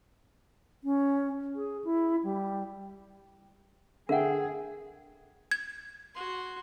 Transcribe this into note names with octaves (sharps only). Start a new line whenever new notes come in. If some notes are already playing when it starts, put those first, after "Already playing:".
C#4
G#4
E4
G3
D3 G#4 A#4 E5 F#5 G5
G#6
F#4 C6